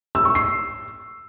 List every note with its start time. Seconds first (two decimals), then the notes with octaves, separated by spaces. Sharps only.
0.15 E6
0.25 C#6
0.35 C7